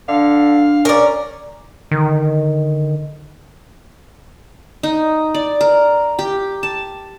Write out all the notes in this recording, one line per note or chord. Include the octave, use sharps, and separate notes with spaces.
D3 D4 F5
C#4 A#4 D5
D3 D#3
D#4
D5
A#4
G4
A5